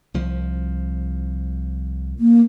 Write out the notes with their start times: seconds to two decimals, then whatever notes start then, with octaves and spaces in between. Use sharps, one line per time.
0.14 C2 F3
2.19 A#3